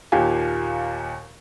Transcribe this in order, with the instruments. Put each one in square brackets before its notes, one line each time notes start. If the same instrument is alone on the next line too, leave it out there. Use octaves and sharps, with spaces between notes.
[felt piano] D#2 A#2 G4 F5 G#5